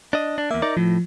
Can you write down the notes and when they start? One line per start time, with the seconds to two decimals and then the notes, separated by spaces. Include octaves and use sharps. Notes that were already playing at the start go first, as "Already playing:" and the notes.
0.13 D4 D#5
0.38 D4
0.51 E2 A#3 E5
0.62 D#4 A#4 D5
0.77 A2 F3